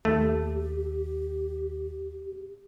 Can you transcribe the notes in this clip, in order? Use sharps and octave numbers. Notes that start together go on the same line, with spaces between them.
D#2 A3 G4